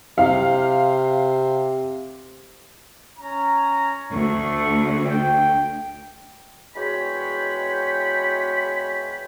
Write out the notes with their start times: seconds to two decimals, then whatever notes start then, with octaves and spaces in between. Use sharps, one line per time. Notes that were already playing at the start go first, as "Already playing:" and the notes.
0.18 C3 F5
3.18 C#4 A#5
4.11 D2 A3 C#6
5.07 G5
6.75 E2 G#3 F#4 C#5 G5 B5